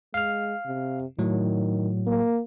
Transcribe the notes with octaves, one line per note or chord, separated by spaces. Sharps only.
G#3 F5 F6
C3
A2 D#3 F#3
A#3